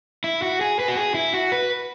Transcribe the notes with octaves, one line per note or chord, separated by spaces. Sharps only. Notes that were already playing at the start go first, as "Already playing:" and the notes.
E4
F#4
G#4
B4
F#4
G#4
E4
F#4
B4